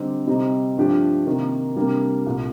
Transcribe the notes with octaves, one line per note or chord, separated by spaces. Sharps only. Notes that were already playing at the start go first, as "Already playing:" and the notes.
Already playing: D3 G3 C4 D#4 G4
C3 G3 C4 D#4
G2 F3 A3 D4 G4
C3 D#3 A#3
C3 G3 A#3 D4 G4
C2 A#2 A3